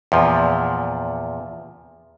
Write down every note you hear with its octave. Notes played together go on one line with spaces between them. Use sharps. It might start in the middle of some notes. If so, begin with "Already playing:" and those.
E2 A#2 F3